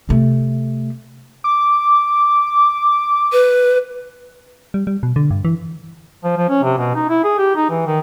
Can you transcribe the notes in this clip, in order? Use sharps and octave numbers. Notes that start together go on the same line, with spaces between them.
C3 A3
D6
B4
G3
G3
B2
D3
G2
E3
F3
F3
C#4
C3
B2
D#4
E4
G#4
G4
D#4
E3
D#3